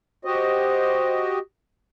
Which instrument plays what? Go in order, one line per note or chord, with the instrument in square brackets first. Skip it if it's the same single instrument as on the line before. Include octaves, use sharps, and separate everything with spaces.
[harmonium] F#4 G4 D#5 [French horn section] C5